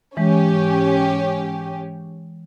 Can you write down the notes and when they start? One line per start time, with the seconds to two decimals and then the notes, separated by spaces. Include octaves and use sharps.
0.17 G#2 E3 G#3 C#4 G4